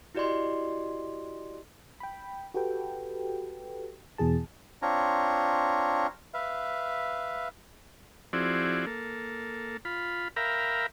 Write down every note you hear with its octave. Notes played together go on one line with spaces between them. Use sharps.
E4 F#4 G4 D5 D#5 C6
G5 B5
F#4 G4 A4 B4 G5
E2 B2 E3 G#4 A5
C4 D4 F4 C#5 A#5
B4 E5 F5
F3 C4 E4 F#4 G#4 D5
A#3 A4
F4 B5
A#4 E5 F5 G5 A#5 B5